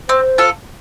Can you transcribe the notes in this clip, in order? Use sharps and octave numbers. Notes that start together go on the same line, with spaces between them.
C4 C5
F4 A4